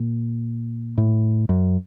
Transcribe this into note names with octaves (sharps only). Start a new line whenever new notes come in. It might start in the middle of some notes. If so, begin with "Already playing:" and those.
Already playing: A#2
A2
F#2